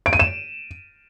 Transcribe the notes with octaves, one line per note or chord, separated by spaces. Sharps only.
D7
D#7
E7